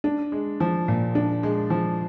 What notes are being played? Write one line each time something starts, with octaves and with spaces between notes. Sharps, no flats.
D4
G#3
F3
A#2
D4
G#3
F3